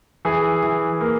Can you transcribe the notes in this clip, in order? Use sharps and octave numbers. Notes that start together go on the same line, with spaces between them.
E3 G#4
E3
A#3